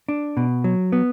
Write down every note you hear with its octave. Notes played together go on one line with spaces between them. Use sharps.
D4
B2
F#3
B3